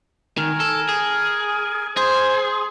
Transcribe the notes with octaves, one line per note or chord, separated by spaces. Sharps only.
D#3 A#4 G#5
A4
G#4
G#4 C5 C6